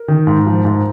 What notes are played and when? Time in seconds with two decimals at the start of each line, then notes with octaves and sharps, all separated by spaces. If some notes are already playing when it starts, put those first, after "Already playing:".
Already playing: A#4
0.08 D#3
0.27 G#2
0.46 F3
0.65 G#2